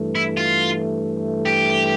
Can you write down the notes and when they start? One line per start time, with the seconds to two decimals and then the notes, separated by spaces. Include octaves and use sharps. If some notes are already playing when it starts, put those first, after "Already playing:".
Already playing: G2 E3 A3
0.15 E4
0.37 F4
1.46 G4